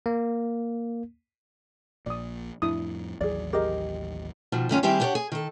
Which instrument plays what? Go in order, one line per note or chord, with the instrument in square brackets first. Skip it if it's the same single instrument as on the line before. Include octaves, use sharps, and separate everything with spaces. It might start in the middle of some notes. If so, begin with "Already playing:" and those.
[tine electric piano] A#3
[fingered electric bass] A#1 A#2 [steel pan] D5 D#6
[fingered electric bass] F2 A2 [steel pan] D4 E4 D#6
[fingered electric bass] A1 D#2 F#3 [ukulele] G#4 D5
[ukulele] G4 G#4 D#5 [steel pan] A#4
[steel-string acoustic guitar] B2 D#3 F3
G2 D#3 C#4 F4
D#3 G3 C4 E4 G4 G#4
D4 E4 G4 A4 C#5 F#5
G#4
D#3 A4